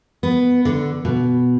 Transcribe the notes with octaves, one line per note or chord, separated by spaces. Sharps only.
B3
D3
B2